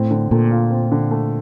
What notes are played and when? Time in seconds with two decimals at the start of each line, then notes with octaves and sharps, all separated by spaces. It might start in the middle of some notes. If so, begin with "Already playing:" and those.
Already playing: A2 C4
0.11 D3
0.31 A#2 A3
0.51 F4
0.71 C4
0.92 D3
1.11 A3